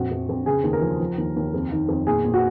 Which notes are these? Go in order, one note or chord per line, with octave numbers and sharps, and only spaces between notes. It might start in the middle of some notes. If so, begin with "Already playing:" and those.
Already playing: A#1 F2 F#4
F2
F2
C#3 G#4
D#2
A#4
F3
F3
D#2
D#2
F2
D#3
F2
A#2 G#4
A#2
F#4